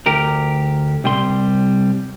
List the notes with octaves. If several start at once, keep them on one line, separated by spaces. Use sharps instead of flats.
D2 G4 A#4
C2 G3 C4 C6